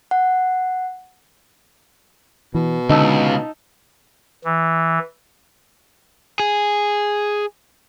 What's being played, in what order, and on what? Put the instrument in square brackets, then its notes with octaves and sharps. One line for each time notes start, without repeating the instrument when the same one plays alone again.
[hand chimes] F#5
[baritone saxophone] B2 [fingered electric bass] E3
[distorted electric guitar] C#2 [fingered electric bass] D3 [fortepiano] D#4 A5 E6
[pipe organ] E3
[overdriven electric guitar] G#4